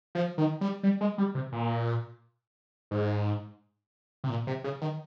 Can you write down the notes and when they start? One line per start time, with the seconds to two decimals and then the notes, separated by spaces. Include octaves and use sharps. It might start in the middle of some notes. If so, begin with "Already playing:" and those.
0.15 F3
0.38 D#3
0.61 G3
0.83 G3
1.01 G#3
1.18 G3
1.35 C3
1.52 A#2
2.91 G#2
4.24 C3
4.30 A#2
4.47 C3
4.64 C#3
4.81 D#3